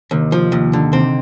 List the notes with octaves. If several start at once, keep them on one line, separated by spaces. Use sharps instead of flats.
D#2 C3 D#3
F3
D#2
D3
C3 D#3 C4